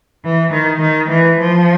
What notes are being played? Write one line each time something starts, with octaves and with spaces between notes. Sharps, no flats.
E3
D#3
D#3
E3
F3